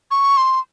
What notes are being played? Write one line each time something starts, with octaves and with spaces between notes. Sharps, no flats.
C#6
C6